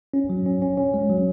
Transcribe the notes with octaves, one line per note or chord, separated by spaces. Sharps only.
C#4
F#3
C#4
C#4
C#4
G#3
F#3